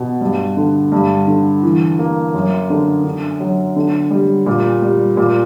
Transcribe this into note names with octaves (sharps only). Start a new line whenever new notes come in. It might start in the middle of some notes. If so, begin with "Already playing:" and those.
Already playing: B2
G2
D3
G2
D3
E3
A#3
F#2
D3
D3
F#3
D3
G3
A#2
G3
A#2